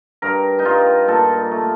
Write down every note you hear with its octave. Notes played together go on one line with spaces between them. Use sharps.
G2 A#4
D#4
G2 F4
A#2 A4
A3